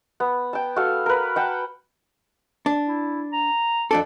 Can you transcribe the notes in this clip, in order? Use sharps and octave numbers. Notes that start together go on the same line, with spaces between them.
B3
G5 A5
F#4 A4 F5
A#4 B4
F#5 G5 A5
D4
E4
A#5
F2 D4 A4 D6